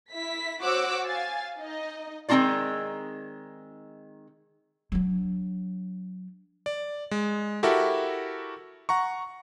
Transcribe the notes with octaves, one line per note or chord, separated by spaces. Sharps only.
E4 B6
F#4 C5 C#5 D6 E6 F#6
F5 G#5 A6
D#4 D#5
D#3 G#3 C4 D#4 F4 D5
F#3 D4
D5
G#3
E4 F#4 G4 A4 A#4 E5
F#5 A#5 C#6